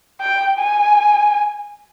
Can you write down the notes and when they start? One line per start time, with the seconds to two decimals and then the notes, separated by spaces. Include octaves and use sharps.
0.21 G5
0.58 G#5